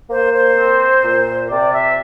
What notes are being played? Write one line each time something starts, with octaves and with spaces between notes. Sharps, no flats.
A#3 C5
C5
C4
A#2
C3 D5
E5